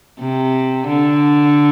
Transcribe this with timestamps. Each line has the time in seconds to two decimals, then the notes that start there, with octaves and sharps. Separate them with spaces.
0.20 C3
0.88 D3